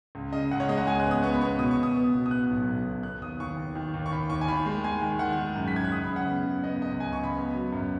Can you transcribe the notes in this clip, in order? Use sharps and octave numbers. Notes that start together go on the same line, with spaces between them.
C#2
C#3 D#5
C#2 F#5
C#5
G#3 D#5
F#5
C#2 G#5
F#6
B3
D#6
B3 C#6
B5
B3 C#6
B2 D#6
C#6
B2
D#6
B3
B2
D#6
B3 F#6
B1
B1
B2
B3 F#6
D#2 D#6
D#2 C#6
D#2
D#3
D#2
C#6
D#2 B5
D#2 C#6
G#5
D#3 B5
G#3
G#3 G#5
D#3
D#3 F#5
G#3
F#2
B6
F#2 G#6
F#6
C#3 D#6
B5
C#3
F#5
B3
C#3
B3 D#5
C#2 D#5
C#2 G#5
C#6
C#2
B5
B3
F#3
F#2